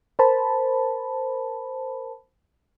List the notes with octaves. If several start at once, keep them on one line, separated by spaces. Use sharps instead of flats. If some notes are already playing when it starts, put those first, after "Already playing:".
A#4 C5 A5 B5